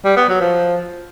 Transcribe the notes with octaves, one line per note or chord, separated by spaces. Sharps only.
G3
B3
F#3
F3